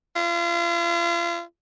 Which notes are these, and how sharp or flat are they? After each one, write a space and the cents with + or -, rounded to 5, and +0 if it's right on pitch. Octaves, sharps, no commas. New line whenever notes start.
F4 -35